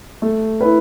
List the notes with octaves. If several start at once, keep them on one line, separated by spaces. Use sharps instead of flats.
A3
E4 B4